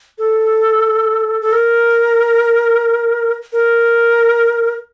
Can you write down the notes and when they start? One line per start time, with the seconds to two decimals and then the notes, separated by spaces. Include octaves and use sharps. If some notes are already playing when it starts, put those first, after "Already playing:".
0.18 A4
1.42 A4
1.52 A#4
3.52 A#4